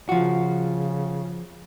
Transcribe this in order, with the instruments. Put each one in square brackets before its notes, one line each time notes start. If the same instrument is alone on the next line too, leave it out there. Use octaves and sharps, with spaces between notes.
[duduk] C#3 [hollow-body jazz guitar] F3 F#4